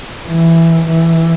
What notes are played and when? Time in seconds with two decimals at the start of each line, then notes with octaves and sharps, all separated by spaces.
0.28 E3
0.87 E3